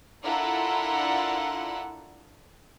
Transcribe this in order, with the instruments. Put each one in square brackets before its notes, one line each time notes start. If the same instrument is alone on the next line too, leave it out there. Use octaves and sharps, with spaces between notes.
[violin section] D4 E4 F4 A4 A#4 F#5